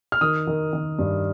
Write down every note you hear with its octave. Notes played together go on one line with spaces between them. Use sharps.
F6
D#3 D#6
D#3
D#3
G2